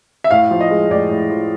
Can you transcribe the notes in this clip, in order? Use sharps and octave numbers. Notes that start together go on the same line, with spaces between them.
E5
A2 F5
F3
D#5
G#3
A2 D5
A2
F3